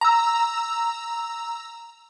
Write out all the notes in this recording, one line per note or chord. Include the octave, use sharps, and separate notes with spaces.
A#5 E6